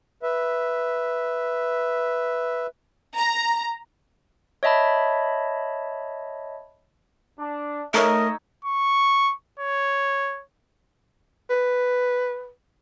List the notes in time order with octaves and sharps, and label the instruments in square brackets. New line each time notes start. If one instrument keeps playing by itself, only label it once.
[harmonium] B4 E5
[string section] A#5
[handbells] C#5 D#5 E5 A5 B5
[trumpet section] D4
[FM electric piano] A3 [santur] D#4 C#5 E5 [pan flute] A#4 [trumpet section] D#5
[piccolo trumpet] C#6
C#5
[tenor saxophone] B4